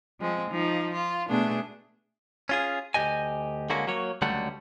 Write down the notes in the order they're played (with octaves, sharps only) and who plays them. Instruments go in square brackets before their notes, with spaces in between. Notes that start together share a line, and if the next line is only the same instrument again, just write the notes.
[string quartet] F3 G#3 C4
F3 D#4
F4
B2 A3 B3 D4 G#4
[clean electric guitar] C#4 F4 G#4
D2 E3 G4 D#5 G#5
D3 G#3 A#3 C#4 F#4
F#3 A#3 C#5
C#2 D3 F#3 G3 A3 F#5